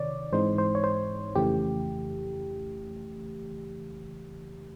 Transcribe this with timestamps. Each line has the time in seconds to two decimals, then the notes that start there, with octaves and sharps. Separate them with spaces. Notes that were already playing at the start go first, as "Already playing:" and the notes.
Already playing: C3 D#3 C#5 D5
0.32 G#2 E3 G#3 C4 D#4 C5
0.58 C5
0.75 C#5
0.84 C5
1.35 F2 C#3 E3 A3 G4